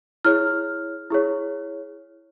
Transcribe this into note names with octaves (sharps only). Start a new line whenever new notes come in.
E4 G#4 C#5 F6
E4 G#4 C#5